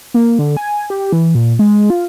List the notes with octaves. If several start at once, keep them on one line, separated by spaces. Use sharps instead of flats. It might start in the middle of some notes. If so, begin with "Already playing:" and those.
A#3
D3
G#5
G4
E3
A#2
G#3
F4